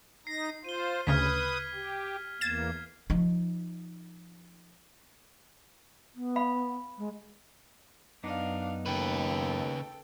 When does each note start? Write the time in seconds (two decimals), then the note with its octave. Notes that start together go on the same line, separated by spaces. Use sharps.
0.27 D#4 A#6 C7
0.64 F4 C5 D#7 G7
1.07 D2 C#3 B4 D#6 F6 G#6 B6
1.74 G4
2.41 E2 A#3 G#6 A6 C7 E7
3.10 F3 D#4
6.15 B3
6.36 F5 B5
6.98 G#3
8.23 F#2 B3 D4 D#4 F5
8.86 D#2 C#3 A4 B4 G5